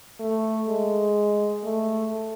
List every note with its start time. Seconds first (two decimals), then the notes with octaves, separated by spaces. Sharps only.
0.20 A3
0.68 G#3
1.64 A3